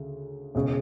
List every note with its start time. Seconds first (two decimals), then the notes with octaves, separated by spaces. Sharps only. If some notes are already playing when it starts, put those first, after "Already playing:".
Already playing: D2 C#3
0.55 E1 C#3